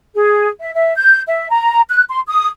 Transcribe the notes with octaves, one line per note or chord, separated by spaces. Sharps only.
G#4
E5
E5
G6
E5
A#5
F#6
C6
D#6